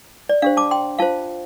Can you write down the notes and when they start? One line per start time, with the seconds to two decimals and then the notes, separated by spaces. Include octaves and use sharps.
0.29 D5
0.42 D4 G4 C5 F5
0.57 A5 D6
0.71 G5 C6
0.99 F4 C5 F5 A5